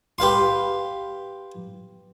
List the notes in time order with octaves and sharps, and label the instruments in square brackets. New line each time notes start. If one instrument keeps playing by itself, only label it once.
[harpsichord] G4 B4 F5 C6